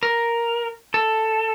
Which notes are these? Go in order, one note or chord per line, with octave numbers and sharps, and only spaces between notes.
A#4
A4